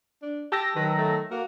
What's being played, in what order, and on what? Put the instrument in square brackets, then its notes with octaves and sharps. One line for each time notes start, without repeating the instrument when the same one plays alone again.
[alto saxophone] D4
[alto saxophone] G4 [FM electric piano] A5 E6 A#6
[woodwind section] D#3 F#3 [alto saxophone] B4
[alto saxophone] A3
[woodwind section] A#3 A#4 [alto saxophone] F#4